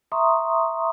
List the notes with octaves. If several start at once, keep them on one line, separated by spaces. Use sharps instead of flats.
E5 A#5 C6 C#6 D#6